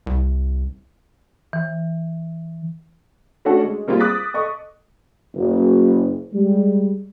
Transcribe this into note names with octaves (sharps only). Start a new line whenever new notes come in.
C2
E3
A3 C#4 D4 F#4 A4
G#3
G3 A#3 C4 F4 G#4
D6 D#6 F#6 A6 B6
A4 D#5 C#6
F#1
G3 G#3